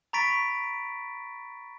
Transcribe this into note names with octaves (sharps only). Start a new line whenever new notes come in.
A#5 B5 C#6 A6 B6 D7